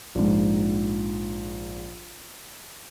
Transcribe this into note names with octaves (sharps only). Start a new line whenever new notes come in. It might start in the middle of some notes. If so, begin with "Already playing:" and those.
A#1 G#2